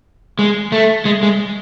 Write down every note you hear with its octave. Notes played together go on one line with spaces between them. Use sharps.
G#3
A3
G#3
G#3